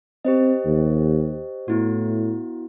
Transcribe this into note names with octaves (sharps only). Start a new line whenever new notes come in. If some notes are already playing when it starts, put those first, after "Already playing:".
C4 G4 C5 D#5
D#2
A2 B3 E4 F#4